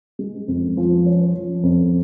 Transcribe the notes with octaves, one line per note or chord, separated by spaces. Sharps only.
G#3
F2
F3
C#4
F3
F2